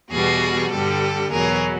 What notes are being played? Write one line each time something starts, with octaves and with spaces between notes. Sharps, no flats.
E2 B2 G3 F#4 G#4
G2 D3 G3 G4 A4
E2 B2 F#3 G#4 A#4